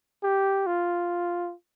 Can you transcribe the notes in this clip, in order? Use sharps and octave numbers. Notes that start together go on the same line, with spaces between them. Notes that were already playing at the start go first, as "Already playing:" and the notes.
G4
F4